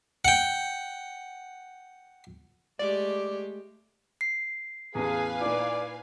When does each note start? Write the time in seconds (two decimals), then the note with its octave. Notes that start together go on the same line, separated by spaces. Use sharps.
0.25 F#5 G5
2.79 G#3 A3 G4 D5
4.21 C7
4.95 A1 E2 G#4 B4 F5 G#5
5.41 A#2 D#4 E4 D5